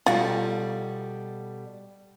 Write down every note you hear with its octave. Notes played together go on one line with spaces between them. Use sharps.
B2 G3 F4 F#4 A4